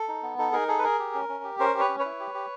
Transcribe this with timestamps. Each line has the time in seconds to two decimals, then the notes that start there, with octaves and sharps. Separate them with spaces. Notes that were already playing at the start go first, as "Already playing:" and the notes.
Already playing: A4
0.08 D#4
0.23 B3
0.38 D#4 A4
0.53 D#4 G#4 A#4
0.68 G#4 A4
0.78 B4
0.84 G#4 A#4
0.99 G4
1.14 C#4
1.29 C#4
1.44 G4
1.59 C#4 A#4 C5
1.74 G4
1.80 B4 C#5
1.89 C#4
1.99 B4 C#5
2.05 E4
2.20 G4
2.34 G4